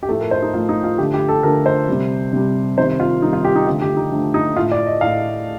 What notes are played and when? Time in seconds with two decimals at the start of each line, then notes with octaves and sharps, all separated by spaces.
0.03 G4
0.09 A2 F3 A3 A4
0.20 A#4
0.31 C5
0.42 D#4
0.54 A2 F3 A3 F4
0.69 D#4
0.84 F4
0.98 D3 F3 A3 G4
1.14 G4
1.29 A4
1.43 D3 F3 A3 A#4
1.66 C5
1.88 C3 G3
2.33 C3 G3
2.78 C3 D#3 G3 C5
3.00 F4
3.22 C3 D#3 G3 D#4
3.33 F4
3.44 G4
3.56 D#4
3.67 D3 F3 A3 F4
3.82 G4
3.97 D#4
4.11 D3 F3 A3
4.34 D#4
4.56 A2 A3 F4
4.72 D5
4.86 D#5
5.01 A2 A3 F5